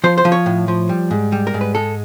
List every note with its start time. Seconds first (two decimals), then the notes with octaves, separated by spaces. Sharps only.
0.04 F3 C5
0.18 C5
0.25 F3
0.32 C#5
0.46 A2
0.68 F3
0.89 G3
1.11 G#2
1.32 G3
1.47 A#4
1.54 G#2
1.61 B4
1.75 G#3 A4